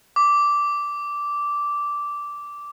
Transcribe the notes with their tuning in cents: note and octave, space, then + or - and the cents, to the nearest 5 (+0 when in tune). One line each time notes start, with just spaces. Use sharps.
D6 -10